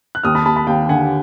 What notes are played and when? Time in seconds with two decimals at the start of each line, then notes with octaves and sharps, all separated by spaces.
0.15 F#6
0.24 D#2 D#6 F6
0.35 A5 B5
0.46 D#2 A5 B5
0.56 A5 B5
0.67 D#2 F5 G5
0.89 D3 F#5 G#5